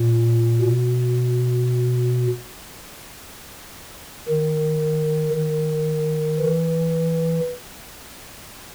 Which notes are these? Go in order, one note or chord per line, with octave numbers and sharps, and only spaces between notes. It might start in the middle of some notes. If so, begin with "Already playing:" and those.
Already playing: A#2
B2
D#3
D#3
E3